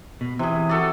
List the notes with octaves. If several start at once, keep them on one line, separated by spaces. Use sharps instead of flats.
B2
C3 E3 G#4
F#4 A4 D5